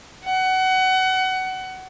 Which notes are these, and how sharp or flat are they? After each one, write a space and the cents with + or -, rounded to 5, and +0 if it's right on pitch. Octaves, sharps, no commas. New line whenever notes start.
F#5 +25